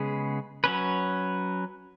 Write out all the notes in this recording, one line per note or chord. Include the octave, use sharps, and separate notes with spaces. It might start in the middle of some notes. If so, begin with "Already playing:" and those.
Already playing: C#3 G#3 B3 G#4
F#3 C#4 B4